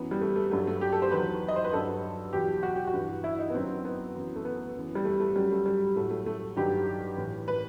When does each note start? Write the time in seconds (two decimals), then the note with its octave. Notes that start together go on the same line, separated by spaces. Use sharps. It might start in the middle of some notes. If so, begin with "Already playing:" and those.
Already playing: F#2 E3 B3
0.11 G3
0.21 A3
0.36 A3
0.51 G2 F#3 A3
0.67 A3
0.81 G4
0.92 A4
1.02 C5
1.11 E2 D#3 F#3 B4
1.48 D#5
1.56 C5
1.64 B4
1.73 G2 F#3 A4
2.33 E2 B2 F#3 G4
2.63 F#4
2.76 G4
2.87 F#4
2.93 G2 E3
3.24 E4
3.39 D#4
3.50 B3
3.55 F#2 D#3 F#3 C4
3.85 B3
4.14 F#2 E3
4.36 A3
4.45 B3
4.74 F#2 E3
4.95 G3
5.05 A3
5.20 A3
5.36 F#2 F#3 G3
5.51 A3
5.66 G3
5.96 A2 F#3 A3
6.11 A3
6.26 A3
6.56 G2 D#3 F#3 G4
7.17 A2 E3
7.48 B4